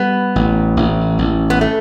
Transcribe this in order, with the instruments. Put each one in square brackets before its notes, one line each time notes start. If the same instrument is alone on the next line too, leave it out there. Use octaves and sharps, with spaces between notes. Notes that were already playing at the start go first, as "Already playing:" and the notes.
Already playing: [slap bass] G3 [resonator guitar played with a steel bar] B3
[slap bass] A1
A1
A1
[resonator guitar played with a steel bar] B3
A3